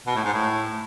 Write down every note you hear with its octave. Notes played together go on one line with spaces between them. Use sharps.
B2
A2
G#2
A2